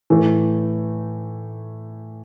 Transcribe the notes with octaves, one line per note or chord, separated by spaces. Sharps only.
A2 E3 A3